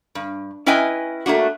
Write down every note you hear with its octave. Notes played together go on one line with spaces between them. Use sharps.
G2
C#4 E4 B4 D#5 G5 G#5
A3 A#3 D4 F#4